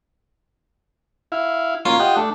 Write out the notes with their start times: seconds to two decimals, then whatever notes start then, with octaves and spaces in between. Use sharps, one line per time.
1.32 E4 F5
1.85 A#3 C#4 F4
1.99 G4 D#5 F#5
2.16 A3 D4